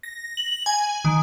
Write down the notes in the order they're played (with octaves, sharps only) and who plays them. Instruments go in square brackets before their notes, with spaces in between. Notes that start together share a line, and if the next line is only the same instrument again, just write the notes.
[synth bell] A#6
F#7
G#5
D#3